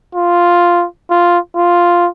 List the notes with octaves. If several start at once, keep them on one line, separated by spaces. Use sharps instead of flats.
F4
F4
F4